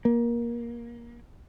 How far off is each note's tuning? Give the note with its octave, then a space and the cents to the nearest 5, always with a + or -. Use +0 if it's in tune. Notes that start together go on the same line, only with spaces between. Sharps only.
A#3 +20